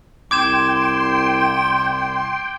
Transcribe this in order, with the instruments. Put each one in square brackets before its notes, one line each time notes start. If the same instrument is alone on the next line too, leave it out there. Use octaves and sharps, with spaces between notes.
[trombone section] C2 [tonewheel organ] G5 [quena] C6 [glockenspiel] D6 G#6 E7